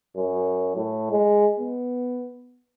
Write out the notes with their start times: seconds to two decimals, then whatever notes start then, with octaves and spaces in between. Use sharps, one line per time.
0.16 F#2
0.76 A2
1.11 G#3
1.59 B3